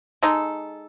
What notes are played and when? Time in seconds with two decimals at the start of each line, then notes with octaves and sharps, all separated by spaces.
0.23 G#3 D#4 A4